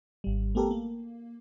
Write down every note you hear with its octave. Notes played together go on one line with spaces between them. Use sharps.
G#1 G3
A3 B3 G4 A4 A#4
A#3